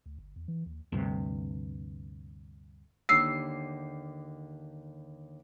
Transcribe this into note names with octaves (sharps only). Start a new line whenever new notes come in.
D2
G1
E2
E3
D#2
D2 G2 C3
D#2 D3 D4 E6 C7